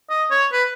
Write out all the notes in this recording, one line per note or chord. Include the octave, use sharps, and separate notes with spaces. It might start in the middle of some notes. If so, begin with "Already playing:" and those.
D#5
C#5
B4